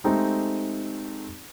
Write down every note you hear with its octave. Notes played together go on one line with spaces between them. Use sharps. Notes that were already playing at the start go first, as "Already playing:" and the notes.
G#3 A3 C4 D#4 G4 A4